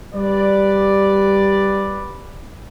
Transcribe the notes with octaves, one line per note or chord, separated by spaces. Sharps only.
G3 G4 B4 D5